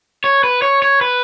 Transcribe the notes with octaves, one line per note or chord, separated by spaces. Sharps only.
C#5
B4
C#5
C#5
B4